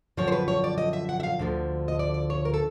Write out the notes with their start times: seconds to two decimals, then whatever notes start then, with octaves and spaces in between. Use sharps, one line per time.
0.17 F#2 D3 F3 C#5
0.28 C5
0.32 B4
0.48 C#5
0.64 D5
0.78 D#5
0.93 E5
1.09 F#5
1.20 E5
1.23 F5
1.39 D2 D3 F3
1.88 D#5
1.99 D5
2.14 D5
2.30 C#5
2.45 A#4
2.54 A4